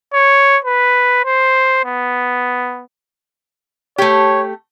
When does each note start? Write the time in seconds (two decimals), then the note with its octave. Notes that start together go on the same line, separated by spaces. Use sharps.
0.14 C#5
0.65 B4
1.25 C5
1.85 B3
3.98 A3 G4 C#5